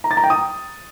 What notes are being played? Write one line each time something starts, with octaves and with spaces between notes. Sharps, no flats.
A#5
A6
A#5
G5
D#6